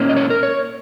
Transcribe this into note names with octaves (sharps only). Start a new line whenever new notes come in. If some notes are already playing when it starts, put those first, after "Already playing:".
Already playing: A#2 A#3 C#4
D#5
C#5
A#4
C#5